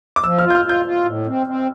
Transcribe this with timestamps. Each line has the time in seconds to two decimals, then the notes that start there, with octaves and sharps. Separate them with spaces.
0.16 D6
0.24 F3 E6
0.39 F6
0.44 F4
0.50 G6
0.55 F6
0.65 F4 G6
0.85 F4
1.06 A2
1.26 C4
1.47 C4